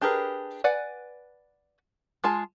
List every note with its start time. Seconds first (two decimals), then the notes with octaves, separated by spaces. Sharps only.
0.01 D4 G4 G#4 A#4 B4
0.64 B4 D5 F#5 G#5
2.24 G#3 F4 G#4 A5